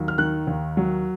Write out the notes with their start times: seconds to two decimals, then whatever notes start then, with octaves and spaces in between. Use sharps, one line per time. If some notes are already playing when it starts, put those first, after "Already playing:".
Already playing: D#2 F#3
0.08 F6
0.18 D#3 F#6
0.47 D#2
0.77 F#3